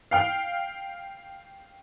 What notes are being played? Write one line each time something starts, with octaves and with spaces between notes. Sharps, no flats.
F5 G5 F6